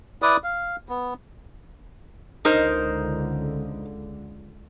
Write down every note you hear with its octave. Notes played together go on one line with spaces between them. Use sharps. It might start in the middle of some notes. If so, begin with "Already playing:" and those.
E4 B4 D5 D#6
F5
B3
C#2 D3 D#4 A#4 C5